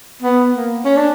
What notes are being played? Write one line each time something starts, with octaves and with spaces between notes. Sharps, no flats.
B3
A#3
C#4
D4